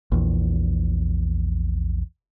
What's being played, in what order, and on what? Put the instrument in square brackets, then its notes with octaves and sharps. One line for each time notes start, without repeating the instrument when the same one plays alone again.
[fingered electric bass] A#1 E2